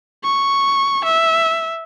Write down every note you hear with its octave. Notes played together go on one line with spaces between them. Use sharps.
C#6
E5